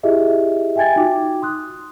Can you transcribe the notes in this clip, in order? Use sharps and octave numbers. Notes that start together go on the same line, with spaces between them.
E4 F4 G4 G#4 D#5 E5
E5 G5 G#5 G#6 A6
D#4 F4 F#4 G5 D6
C6 D#6 F#6